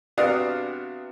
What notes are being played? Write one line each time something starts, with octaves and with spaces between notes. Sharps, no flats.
C3 B3 D4 F#4 F5 D#6